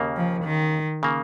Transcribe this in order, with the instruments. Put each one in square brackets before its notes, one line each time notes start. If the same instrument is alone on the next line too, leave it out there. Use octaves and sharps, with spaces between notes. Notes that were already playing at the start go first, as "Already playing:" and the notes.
Already playing: [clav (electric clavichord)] D#2 C#3 A#3
[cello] F3
D#3
[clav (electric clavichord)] C#3 A#3